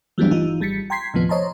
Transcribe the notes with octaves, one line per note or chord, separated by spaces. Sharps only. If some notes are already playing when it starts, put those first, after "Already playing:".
E3 F#3 G3 A3 B3 D4
G1 E3 D#4 F4
G#1 G3 A6 B6 C#7
G5 A#5 C6 G#6 B6 C7
D#2 A2 C3 F3 B3
C5 C#5 D#5 A5 A#5 C6